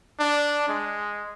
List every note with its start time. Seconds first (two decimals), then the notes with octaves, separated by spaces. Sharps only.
0.20 D4
0.69 G#3